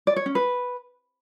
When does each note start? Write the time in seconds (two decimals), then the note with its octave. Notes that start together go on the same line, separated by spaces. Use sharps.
0.07 D5
0.16 C#5
0.26 C#4
0.35 B4